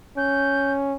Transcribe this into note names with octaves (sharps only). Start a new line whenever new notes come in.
C#4 G6